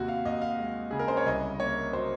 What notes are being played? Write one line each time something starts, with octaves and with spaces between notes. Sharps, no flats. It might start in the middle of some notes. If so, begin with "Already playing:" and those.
Already playing: D#2 C3 F#4
F5
D#2 D#5
F5
G#3
C#3 G#4
A#4
C5
C#5
C2 D#5
A#3 C#5
F#3 C5